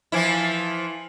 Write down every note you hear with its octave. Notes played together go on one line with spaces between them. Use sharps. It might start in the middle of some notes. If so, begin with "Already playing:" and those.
E3 F3 E4